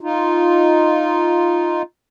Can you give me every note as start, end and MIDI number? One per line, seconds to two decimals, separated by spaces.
0.01 1.82 63
0.01 1.82 65